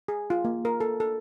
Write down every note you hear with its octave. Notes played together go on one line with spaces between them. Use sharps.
G#4
F4
A#3
A#4
A4
A4